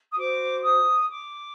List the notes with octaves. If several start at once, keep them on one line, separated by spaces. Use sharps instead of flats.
D#6
F#4 C5 D6
D#6
D6